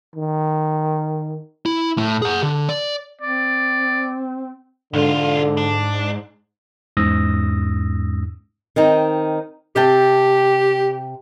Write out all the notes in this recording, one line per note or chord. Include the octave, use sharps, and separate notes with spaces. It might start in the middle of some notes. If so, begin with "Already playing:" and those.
D#3
E4
A2
G#4 F#5
D3
D5
C4 D5
B1 G#2 D3 F4
D4
E2 G#2 C#4 D#6 E6 A#6
D#3 C4 D#4
C3 G4 G5 A5